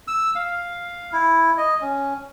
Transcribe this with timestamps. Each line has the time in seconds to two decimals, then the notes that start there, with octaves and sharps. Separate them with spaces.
0.08 E6
0.35 F5
1.12 E4
1.57 D#5
1.81 C#4